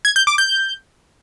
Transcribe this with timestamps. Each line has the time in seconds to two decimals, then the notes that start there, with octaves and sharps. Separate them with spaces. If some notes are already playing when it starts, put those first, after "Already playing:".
0.05 G#6
0.16 G6
0.27 D6
0.38 G6